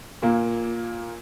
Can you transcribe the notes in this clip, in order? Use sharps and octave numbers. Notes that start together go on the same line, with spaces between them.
A#2 A#3